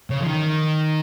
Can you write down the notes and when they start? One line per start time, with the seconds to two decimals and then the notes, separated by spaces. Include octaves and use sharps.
0.10 C#3
0.21 F3
0.26 D#3